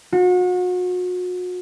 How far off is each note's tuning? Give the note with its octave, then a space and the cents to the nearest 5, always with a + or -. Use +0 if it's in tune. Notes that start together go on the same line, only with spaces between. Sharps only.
F#4 -35